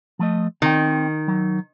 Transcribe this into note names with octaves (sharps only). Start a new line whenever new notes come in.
F3 A3 D#5
D#3 C4 G5
F#3